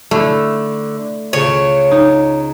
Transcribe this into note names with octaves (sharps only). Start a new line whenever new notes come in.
D3 A3 E4
C#2 C#3 C#5
D#4